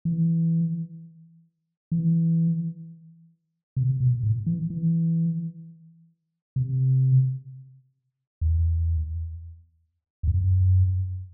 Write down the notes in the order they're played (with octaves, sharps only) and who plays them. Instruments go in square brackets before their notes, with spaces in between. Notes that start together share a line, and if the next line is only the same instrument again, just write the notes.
[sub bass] E3
E3
C3
B2
A2
E3
E3
C3
E2
E2
F#2